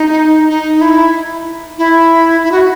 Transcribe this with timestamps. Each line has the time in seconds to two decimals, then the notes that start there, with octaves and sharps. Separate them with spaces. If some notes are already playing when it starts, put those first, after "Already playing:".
Already playing: D#4
0.49 D#4
0.81 E4
1.78 E4
2.44 E4
2.52 F#4